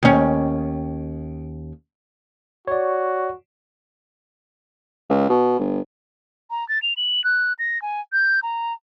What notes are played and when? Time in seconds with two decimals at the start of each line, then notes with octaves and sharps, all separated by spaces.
0.03 D#2 C#4
2.67 F#4 C#5 D5
5.10 C#2
5.29 B2
5.59 G1
6.51 A#5
6.69 A6
6.82 F7
6.97 F#7
7.24 F#6
7.59 A#6
7.82 G#5
8.13 G6
8.43 A#5